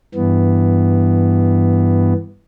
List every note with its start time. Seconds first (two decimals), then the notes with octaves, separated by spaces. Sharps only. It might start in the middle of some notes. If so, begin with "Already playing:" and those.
0.15 G2 E3 B3